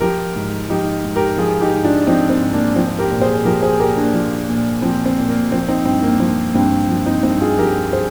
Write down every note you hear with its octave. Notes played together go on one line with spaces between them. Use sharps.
F3 G4 A#4
G#2
F3 D#4 G4
G#2
G4 A#4
F3 F4 G#4
D#4 G4
G#2
D4 F4
F3 C4 D#4
C4
G#2
A#3 D4
F3 C4
G4 A#4
A#2
G#4 C5
F3 G4 A#4
G#4 C5
A#2 G4 A#4
A#3 D4
F3
A#2
F3 C4
C4
A#2
A#3
F3 C4
C4 D#4
G2 C4
A#3
F3 C4
G2 C4
F3
C4 D#4
G2 C4 D#4
F4 G#4
F3 G4 A#4
G#4 C5